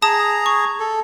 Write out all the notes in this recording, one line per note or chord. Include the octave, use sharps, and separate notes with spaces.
G#4 A5 A#5 D#6
C#6
A4